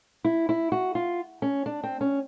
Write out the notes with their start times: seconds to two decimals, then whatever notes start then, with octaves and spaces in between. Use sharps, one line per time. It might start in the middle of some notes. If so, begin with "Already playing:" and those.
0.24 E4
0.49 E4
0.72 F#4
0.95 F4
1.42 C#4
1.66 D4
1.83 C4
2.01 C#4